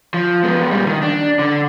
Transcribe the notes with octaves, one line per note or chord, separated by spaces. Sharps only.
F3
G#3 B3
A#2 G3
D#3
D4
D3